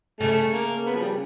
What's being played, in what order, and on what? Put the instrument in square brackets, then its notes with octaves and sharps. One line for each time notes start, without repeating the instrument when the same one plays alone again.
[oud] C#3 [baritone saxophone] A3
[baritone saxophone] A#3
B3
F3
G3